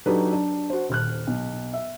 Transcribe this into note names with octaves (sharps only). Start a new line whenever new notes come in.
F#3 D4 D#4 G4 A4 B4
D4
F#4 C5
D#1 F6 F#6
B1
E5